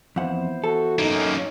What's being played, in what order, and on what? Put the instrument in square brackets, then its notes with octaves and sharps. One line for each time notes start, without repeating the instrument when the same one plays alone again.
[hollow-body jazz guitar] F2 F#5 [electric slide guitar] E3 B3 C5
[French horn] F#4 [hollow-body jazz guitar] A4
[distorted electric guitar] F#2 A#3 [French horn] D#4